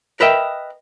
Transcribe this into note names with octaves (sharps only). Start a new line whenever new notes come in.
A#4 B4 D#5 E5 G5